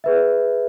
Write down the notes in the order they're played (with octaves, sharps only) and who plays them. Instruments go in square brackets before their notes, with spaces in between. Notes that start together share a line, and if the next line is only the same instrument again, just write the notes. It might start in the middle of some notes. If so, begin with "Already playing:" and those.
[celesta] G#4 B4 E5